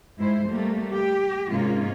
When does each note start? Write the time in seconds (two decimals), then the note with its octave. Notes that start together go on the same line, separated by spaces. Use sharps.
0.17 G#2 G#3 E4 C5
0.47 G3 A3 A#3
0.93 G4
1.49 G#2 C3 G#3 A#3 C#4 F4